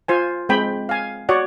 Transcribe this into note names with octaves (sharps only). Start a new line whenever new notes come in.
F4 C5 G#5
G#3 C4 G5 B5
F5 G#5
F#4 C#5 D5 F#5